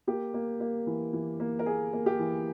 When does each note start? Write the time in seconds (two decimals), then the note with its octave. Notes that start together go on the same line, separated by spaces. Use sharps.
0.07 A#3 G4
0.34 A#3
0.61 A#3
0.87 E3
1.13 E3
1.40 A#3
1.59 A#4
1.66 A#3 G#4
1.93 A#3
2.06 G4
2.19 E3